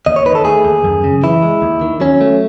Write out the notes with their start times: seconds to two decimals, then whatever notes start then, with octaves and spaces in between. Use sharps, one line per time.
0.06 D#2 D#5
0.16 C#5
0.25 D#3 B4
0.35 A4
0.45 A3 G#4
0.65 D#2
0.84 F#2
1.04 C#3
1.23 E3 E4
1.42 G#3
1.62 D#2
1.81 D#3
2.00 F#3 C#4
2.21 A3